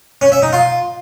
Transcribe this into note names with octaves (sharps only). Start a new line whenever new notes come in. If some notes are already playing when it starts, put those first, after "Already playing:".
C#4
E5
D#4
F4